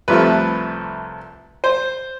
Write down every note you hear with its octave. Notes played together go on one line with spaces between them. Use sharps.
C2 C3 F3 A3 B4
C5